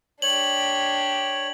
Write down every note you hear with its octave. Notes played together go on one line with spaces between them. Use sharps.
D4 G4 C#5 F#7